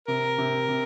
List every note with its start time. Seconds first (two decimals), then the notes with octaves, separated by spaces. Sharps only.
0.08 C3 A#4
0.38 C3
0.69 C3